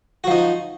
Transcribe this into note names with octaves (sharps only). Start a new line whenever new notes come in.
F3 D#4 F#4